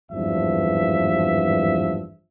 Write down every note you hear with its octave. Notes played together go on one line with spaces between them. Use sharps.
G#1 E2 G2 F3 E5